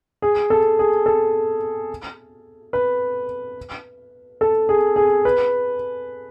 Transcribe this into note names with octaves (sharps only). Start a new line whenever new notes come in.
G#4
A4
G#4
A4
B4
A4
G#4
G#4
B4